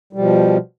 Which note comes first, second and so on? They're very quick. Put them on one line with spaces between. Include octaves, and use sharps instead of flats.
G3 B2 F3